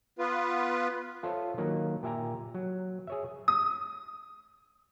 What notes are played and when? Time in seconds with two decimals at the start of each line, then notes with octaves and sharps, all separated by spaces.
0.19 B3 F4 B4
1.23 F4 A4 C5 C#5 E5
1.58 D#3 F#3 A#3
2.03 A#2 G4 E5 G#5 A#5
2.54 F#3
3.07 G#4 C#5 E5
3.48 D#6